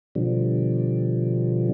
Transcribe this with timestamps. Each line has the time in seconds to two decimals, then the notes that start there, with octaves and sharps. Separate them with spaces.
0.15 B2 D3 F3 G3